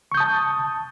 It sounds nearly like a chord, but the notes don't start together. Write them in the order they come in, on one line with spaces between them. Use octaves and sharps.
C#6 G6 D#6 A5